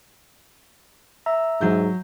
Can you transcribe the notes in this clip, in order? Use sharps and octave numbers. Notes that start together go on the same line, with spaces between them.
E5 A#5 E6
G#2 F#3 G6